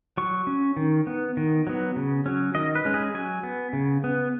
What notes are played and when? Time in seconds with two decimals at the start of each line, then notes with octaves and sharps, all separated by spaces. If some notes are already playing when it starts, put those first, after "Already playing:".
0.17 F#3 C#6
0.47 C#4
0.77 D#3
1.07 B3
1.37 D#3
1.67 F#3 B3
1.96 C#3
2.26 F#3 C#4
2.55 D#3 D#5
2.75 B4
2.85 G#3 C#4
2.94 G#4
3.14 F#3 G#5
3.43 B3
3.73 C#3
4.04 B3